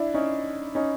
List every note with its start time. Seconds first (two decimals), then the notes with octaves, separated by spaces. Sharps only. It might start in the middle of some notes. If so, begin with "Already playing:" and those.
Already playing: D4 E4
0.14 C#4 D#4
0.75 C#4 D#4